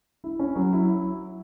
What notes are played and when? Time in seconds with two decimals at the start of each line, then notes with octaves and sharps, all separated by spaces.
0.24 E4
0.39 C#4
0.56 F#3
0.73 E4